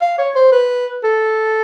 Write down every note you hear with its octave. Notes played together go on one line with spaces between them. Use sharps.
F5
C#5
C5
B4
A4